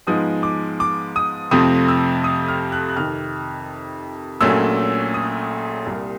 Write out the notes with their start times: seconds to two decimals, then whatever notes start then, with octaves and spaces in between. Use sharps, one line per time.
0.07 G#2 F3 G#3 B3 D#4 D#6
0.43 D6
0.80 D6
1.16 D#6
1.51 F2 C3 F3 A3 C4 D#6
1.88 E6
2.24 D#6
2.48 F6
2.72 F#6
2.89 F#6
2.96 F2 C3 D#3 F6
4.41 A#1 A#2 F#3 A3 C#4 E6
5.14 D#6
5.86 C2 A#2 G3